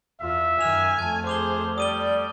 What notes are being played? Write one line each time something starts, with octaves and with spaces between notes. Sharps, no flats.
E2 F4 E5
F#2 D#3 G#5 F6 F7
F2 A3 A5 G#6
G#4 C5 D6 F7 G7
G3 D5 D#6 D#7 G7